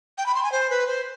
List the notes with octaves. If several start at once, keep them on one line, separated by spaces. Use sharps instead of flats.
G5
B5
C6
G#5
C5
B4
C5